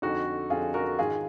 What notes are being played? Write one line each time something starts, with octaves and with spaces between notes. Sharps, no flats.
F2 D3 D#4 F#4
F2 D3 F4 G#4
F#4 A#4
G#2 D#3 F4 G#4